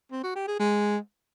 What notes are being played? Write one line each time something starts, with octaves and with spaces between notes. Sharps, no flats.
C4
F#4
G4
G#4
G#3